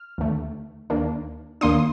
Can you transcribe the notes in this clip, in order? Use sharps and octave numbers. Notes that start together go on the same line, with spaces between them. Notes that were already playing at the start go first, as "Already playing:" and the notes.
Already playing: F6
D#2 D3 A3
D#2 D#3 A#3 D4
D#2 D#3 A#3 D4 C6 D#6